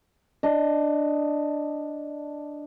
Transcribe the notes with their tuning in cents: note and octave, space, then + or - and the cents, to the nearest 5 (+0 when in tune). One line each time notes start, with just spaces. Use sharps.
D4 +0 D#5 +0